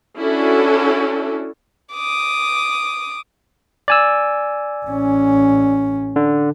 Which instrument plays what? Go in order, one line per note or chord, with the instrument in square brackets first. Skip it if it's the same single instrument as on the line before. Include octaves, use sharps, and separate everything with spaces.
[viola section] C#4 D4 E4 F#4 A4
[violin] D6 D#6
[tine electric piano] D5 G#5 E6
[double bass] A1 C#4
[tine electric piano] D3